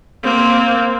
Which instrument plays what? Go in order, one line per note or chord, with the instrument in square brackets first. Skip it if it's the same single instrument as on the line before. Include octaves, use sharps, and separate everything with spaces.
[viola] A#3 C4